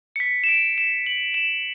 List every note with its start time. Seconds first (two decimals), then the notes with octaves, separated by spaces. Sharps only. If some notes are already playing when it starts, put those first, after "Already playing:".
0.16 C#7
0.20 B6
0.44 E7
0.48 D7
0.78 E7
1.06 F#7
1.34 E7